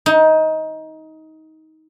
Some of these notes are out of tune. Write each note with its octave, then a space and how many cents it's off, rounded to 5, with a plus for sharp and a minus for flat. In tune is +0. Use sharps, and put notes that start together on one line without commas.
D#4 +20